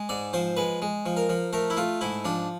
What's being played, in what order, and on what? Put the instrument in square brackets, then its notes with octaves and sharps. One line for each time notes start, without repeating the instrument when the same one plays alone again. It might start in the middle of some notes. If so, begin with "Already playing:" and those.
Already playing: [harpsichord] G#3
G#2 D5
F3 C5
G#3 B4
G#3
F3
A#4
F3
A3 A#4
E4
A3 F4
G#2 E4
F3 D4